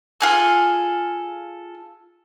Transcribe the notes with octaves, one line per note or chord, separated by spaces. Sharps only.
F4 G#4 A4